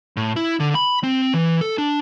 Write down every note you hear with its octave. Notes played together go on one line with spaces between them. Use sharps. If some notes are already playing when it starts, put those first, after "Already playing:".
A2
E4
D3
B5
C4
E3
A4
D4